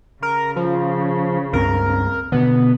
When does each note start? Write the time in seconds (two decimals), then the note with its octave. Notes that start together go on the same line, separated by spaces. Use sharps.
0.22 C#3 A#4
0.56 F3
1.53 C#2 G2 C4 A#4
2.32 B2 D3 B3